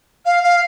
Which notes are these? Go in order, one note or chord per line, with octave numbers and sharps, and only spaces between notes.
F5
F5